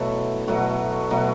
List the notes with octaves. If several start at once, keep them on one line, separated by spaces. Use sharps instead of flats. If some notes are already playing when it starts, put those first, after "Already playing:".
Already playing: B2 F#3 A3 E4
B2 F#3 A3 F#4
B2 F#3 A3